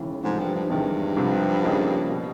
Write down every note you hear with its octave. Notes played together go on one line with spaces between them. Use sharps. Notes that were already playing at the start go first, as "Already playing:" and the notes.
Already playing: E1 D#2 C#3 E3
G#2 C3 F3 A3
G2
G2
E2 G2 C3 D#3 G#3
C2 C3 F3
C#3 F3 A#3 D#4 G#4
B2